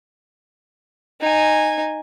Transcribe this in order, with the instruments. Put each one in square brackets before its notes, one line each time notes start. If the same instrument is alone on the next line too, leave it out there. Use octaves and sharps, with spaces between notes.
[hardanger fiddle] D#4 G#5